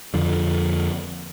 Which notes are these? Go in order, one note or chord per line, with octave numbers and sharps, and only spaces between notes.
F2 D3 F3